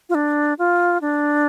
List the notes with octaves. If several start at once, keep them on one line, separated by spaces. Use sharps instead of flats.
F4
D4
F4
D4